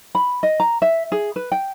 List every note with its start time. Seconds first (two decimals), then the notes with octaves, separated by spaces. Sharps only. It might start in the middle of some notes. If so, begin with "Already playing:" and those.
0.15 B5
0.43 D#5
0.60 A#5
0.82 E5
1.12 G#4
1.36 B4
1.52 G5